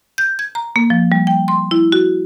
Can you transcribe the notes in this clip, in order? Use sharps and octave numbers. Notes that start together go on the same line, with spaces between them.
G6
G#6
A#5
A#3
F3
G3
G5
C6
E4
F#4